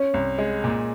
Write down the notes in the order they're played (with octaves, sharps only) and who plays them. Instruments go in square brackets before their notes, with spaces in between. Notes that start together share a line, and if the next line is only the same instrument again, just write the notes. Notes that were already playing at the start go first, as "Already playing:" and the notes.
Already playing: [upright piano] C#4
[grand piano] C2
G#3
A#2